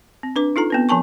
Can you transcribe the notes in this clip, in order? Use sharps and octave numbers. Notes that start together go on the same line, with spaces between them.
C4
D4 B4 D6
D#4 F4 A4 A#5
B3 C4 B4
F3 A#4 G#5 A5 C#6